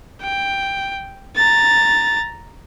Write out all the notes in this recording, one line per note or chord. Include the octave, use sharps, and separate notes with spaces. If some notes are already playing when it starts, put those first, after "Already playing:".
G5
A#5 A6